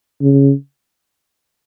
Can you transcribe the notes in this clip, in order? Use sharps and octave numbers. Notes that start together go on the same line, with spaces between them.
C#3